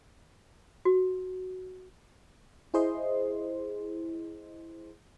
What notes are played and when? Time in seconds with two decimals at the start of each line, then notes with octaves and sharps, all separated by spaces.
0.85 F#4
2.74 E4 G#4 C5 D#5 C6